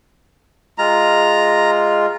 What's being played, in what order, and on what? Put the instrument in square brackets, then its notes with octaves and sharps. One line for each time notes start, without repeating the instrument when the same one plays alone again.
[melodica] G#3 F4 [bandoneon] A#5